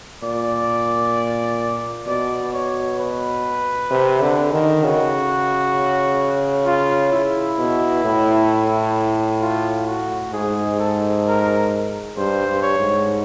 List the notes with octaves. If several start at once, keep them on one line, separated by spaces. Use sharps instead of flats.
A#2 D5
B2 D5
C#5
B4
C3
D3
D#3
C#3 F#4
F4
E4
B2
A2
F4
F#4
G#2 G#4
A4
A#4
G2 C5
G2
C#5
G#2